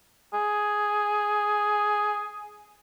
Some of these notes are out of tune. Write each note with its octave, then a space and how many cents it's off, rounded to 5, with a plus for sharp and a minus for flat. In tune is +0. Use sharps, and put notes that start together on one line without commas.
G#4 +5